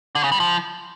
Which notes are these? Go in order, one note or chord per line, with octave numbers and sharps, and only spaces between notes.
D3
C#3
G3
F3